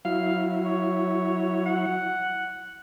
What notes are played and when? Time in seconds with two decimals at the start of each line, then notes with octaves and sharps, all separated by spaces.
0.05 F#3 E4 F5
0.65 C#5
1.66 F#5